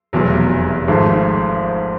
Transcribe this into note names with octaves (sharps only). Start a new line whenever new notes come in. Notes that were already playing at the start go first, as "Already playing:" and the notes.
F1 E2 B2 F#3
G#1 G#2 F3 A3